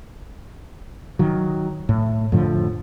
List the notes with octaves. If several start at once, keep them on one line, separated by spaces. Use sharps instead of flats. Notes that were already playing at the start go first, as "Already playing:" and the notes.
D#3 F#3
A2
F2 A2 D3 F3